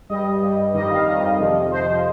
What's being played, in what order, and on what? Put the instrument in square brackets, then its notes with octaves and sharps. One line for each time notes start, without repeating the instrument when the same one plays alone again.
[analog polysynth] G2 G3 D#5
G2 G3
F2 D#3 G3 D#5
F5
F2 D#3 G3 D#5
F2 C3 F3
F2 C3 F3 C5